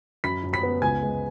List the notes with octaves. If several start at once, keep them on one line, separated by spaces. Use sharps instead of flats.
F#2 B5 B6
F#2
B5 B6
B3
C#2 G#5 G#6
G#3